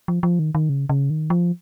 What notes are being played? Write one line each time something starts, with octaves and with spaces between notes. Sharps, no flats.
F3
F3
D#3
D#3
C#3
C#3
D#3
F3